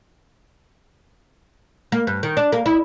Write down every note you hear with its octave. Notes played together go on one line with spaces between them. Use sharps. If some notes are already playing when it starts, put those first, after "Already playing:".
A#3
G2
D#3
D4
A#3
E4